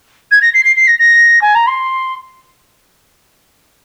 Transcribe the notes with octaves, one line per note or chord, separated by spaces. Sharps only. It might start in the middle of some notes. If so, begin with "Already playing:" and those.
G#6
A#6
C7
C7
C7
A#6
A#6
G#5
A#5
C6